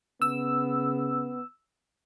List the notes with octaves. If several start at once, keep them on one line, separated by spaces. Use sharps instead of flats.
C#3 B3 E6